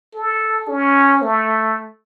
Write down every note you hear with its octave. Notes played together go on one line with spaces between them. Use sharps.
A4
C#4
A3